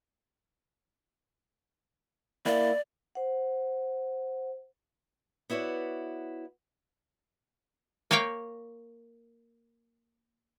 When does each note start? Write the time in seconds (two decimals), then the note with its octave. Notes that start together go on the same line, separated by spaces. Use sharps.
2.46 A#3 E4 D5
3.15 C5 F#5
5.50 B3 E4 F#4 C#5 D5
8.11 A#3 A#4 C#5 F5 G5